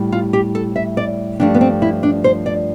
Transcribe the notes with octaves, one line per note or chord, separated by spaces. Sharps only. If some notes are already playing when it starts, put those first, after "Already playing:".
Already playing: A2 G3
F4
G4
A4
E5
D5
G2 F3 A3 D4
B3
C4
E4
D4
C5
D5